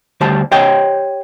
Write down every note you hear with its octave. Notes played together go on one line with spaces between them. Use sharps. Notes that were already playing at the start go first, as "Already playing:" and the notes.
D2 G3 G4 C5 A5
G4 C5 C#5 D#5 F#5 G5